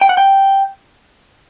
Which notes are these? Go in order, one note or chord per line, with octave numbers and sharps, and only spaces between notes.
G5
F#5
G5